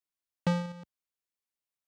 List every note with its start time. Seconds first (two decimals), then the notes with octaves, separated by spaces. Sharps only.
0.47 F3